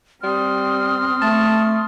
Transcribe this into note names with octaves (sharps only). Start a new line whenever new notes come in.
G3 C4 C6 D#6 F6
A3 A5